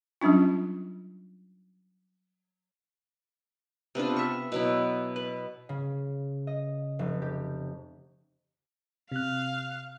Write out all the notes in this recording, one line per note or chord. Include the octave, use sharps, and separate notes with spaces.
F#3 G3 C#4 D4 F4
C3 B3 D4 F4
E5 C#6
B2 F#3 E4
B4
C#3
D#5
F1
G4
C3 F5 F#6